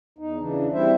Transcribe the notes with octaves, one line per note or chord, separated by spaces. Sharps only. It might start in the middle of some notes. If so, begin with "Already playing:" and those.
E2 D#4
C#3 E3 D4
G3 C4 E4 C5 E5